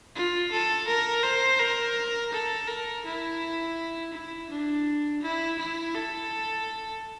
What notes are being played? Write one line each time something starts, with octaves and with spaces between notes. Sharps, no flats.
F4
A4
A#4
C5
A#4
A4
A#4
E4
E4
D4
E4
E4
A4